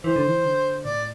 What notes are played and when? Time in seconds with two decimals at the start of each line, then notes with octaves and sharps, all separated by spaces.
0.04 E3 C5
0.16 D3
0.27 E3
0.45 D3
0.85 A2 D5